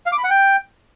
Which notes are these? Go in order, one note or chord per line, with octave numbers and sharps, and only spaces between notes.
F5
D6
B5
F#5
G5